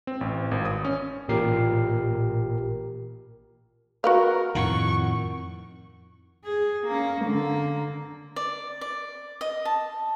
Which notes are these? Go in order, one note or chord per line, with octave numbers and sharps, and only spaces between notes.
C4
A1
G#1
D#6
C#4
A1 A#2 G4 A#4 C7
F#4 A#4 B4 F5
F2 A2 D#3 F#5 C#6
G#4
A#3 C#4
D3 A#3
D5
D5
D#5
A5